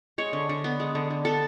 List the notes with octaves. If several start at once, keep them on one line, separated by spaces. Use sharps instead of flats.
G#3 C#5
D3
D3
B3
G#3
D3
D3
B3 A4